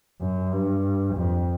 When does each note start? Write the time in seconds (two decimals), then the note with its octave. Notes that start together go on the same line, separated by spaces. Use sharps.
0.21 F#2
0.53 G2
1.16 F2